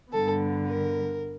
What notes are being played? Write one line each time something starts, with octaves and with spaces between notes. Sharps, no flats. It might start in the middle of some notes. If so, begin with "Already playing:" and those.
G2 D3 G3 B3 A4
A#4